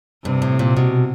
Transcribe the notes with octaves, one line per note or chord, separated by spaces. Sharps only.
G2 C3
A2
A#2
B2